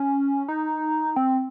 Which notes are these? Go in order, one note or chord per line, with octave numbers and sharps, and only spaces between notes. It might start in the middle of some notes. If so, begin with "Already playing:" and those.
Already playing: C#4
D#4
C4